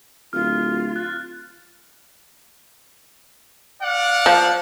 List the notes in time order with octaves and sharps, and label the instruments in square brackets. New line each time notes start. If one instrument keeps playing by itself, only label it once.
[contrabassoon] D1 [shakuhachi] F4 [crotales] F6
[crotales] F#6 A6
[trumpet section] D5 F5 F#5
[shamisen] F3